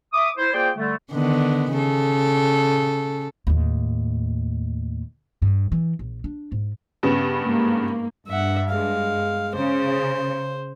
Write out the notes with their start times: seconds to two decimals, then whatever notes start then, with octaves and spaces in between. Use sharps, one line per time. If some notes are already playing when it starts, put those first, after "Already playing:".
0.13 E5 D6 D#6
0.37 E4 C5
0.54 A#3 F4 G#4 C5 D5 G5
0.76 D3 G3 A3
1.12 D3 D#3 B3
1.73 C#3 A4
3.47 D#2 A2
5.42 G2
5.72 E3
5.99 A#1
6.24 D4
6.52 G#2
7.03 G2 C#3 B3
7.42 G#2 A#3
8.27 G2 E5 F#5
8.69 G#3 F5
9.56 C#3 C5